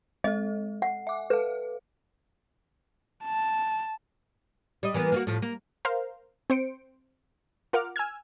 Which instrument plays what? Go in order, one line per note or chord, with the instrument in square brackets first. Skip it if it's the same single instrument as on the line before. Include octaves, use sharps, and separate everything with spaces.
[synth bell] G#3 A4 [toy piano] D#5
[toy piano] F#5
[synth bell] E5 D6
[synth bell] A4 F5 [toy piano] B4
[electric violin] A5
[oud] G3 D#5
E3 A#3 B3
A#3 F4 F#4
A2 F3
A#3
[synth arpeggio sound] A#4 C5 F5
C4 C5 C#7 D7
F4 A#4 F#5 D6 F6
G#5 E6 F6 G#6